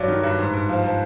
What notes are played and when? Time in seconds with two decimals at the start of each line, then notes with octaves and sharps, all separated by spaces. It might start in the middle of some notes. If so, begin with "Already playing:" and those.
Already playing: G2 F#3 D5
0.08 D#3
0.23 G2
0.39 G#2
0.53 G#2
0.69 F3
0.84 F3